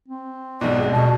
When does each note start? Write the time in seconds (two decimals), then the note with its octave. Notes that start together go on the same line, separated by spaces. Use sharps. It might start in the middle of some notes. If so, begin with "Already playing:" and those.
0.08 C4
0.61 B1 G#2 B2 D5
0.76 D#1 G#3
0.93 B2 A5